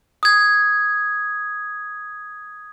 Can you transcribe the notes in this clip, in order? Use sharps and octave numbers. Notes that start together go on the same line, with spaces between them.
D#6 G#6